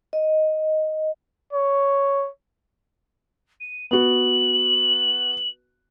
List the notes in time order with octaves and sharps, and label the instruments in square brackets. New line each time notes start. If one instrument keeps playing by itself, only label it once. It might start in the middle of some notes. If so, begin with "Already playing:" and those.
[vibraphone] D#5
[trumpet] C#5
[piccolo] D#7
[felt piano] B3 F#4 [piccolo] F#7